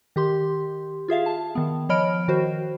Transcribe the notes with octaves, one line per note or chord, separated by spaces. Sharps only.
D#3 G4 C6
F4 G#4 E5 F5
A5
D#3 B3
F3 C#5 D#5 B5 F6 D7
D#3 F#4 C5